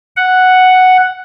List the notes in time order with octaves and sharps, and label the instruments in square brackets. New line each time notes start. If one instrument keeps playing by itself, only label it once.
[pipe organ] F#5